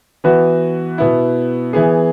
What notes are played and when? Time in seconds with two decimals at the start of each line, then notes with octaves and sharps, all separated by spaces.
0.24 E3 B3 F#4 B4
0.98 B2 B3 E4
1.73 E3 B3 G#4